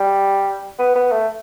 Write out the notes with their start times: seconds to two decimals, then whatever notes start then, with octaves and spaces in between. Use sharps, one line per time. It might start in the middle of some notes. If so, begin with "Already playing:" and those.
Already playing: G3
0.79 B3
0.96 B3
1.12 A3